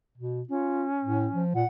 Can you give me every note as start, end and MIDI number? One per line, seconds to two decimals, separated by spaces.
0.18 0.42 47
0.49 1.43 61
0.49 0.85 65
1.04 1.27 45
1.32 1.52 53
1.55 1.64 46
1.55 1.67 78